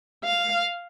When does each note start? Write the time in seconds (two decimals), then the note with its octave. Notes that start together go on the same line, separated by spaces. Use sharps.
0.24 F5